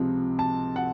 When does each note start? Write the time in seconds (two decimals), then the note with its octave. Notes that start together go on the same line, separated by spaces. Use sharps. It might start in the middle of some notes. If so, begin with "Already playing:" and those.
Already playing: C#2 C3 F3 C4
0.39 A5
0.76 F#5